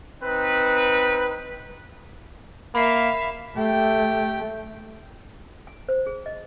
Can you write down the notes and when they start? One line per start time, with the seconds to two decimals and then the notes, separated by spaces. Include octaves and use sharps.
0.22 C4 D#4 B4
2.75 A#3 E5 F5 B5 C7
3.57 A3 G4 G5
5.67 G#5
5.89 C5
6.07 G#4
6.26 D#5